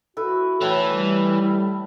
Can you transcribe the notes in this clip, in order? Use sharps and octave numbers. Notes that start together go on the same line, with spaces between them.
E4 F#4 A4 B4 E5
A2 E3 C#5 B5
G3 A4